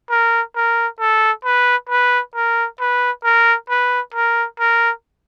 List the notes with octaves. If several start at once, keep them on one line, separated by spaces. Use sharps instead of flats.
A#4
A#4
A4
B4
B4
A#4
B4
A#4
B4
A#4
A#4